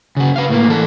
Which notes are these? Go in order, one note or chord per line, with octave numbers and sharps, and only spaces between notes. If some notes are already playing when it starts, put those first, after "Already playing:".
C#3 F#4
B4 F5
A2 A#3
E3 A4